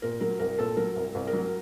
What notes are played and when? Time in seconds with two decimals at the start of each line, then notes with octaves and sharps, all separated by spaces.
0.02 A#2 A#4
0.21 F#3 A#4
0.39 C2 A#4
0.59 A#2 A4
0.77 F#3 A#4
0.96 C2
1.15 C2
1.27 A#4
1.33 F#3